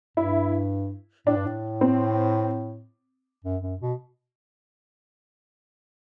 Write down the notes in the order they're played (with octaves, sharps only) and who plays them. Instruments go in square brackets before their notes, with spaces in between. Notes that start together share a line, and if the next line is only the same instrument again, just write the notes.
[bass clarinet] G2 [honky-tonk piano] E4
[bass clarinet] A2 [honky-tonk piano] D4
[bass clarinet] G2
A2
[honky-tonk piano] C4
[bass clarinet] F#2
F#2
B2